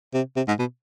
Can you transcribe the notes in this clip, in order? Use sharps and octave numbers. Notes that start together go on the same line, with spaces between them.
C3
C3
G#2
B2